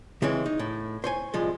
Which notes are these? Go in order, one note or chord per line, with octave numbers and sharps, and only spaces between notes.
C#3 E3 G#3 C4 C#5
D#4
A2
C5 C#5 G#5
C2 A2 F3 G#3